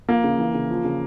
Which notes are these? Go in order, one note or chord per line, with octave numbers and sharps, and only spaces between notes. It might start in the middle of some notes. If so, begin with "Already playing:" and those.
F3 A#3
C#3
E3
C#3
F3
C#3